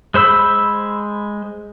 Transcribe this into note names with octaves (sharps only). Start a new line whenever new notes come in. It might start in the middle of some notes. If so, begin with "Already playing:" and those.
G#3 C5 B5 E6